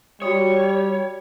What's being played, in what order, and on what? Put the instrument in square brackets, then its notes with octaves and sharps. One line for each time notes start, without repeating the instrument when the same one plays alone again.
[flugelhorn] G3 [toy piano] F#4 D#6 [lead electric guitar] C#5